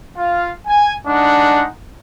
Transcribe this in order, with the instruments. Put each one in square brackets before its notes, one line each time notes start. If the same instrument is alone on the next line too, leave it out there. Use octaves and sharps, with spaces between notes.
[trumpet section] F4 F5
G#5
[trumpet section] G#3 D#4 F#5 [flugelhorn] D4